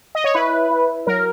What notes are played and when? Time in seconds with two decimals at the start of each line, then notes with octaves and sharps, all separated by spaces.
0.15 D#5
0.24 C#5
0.34 E4 B4
0.70 E4
1.07 F#3 A#4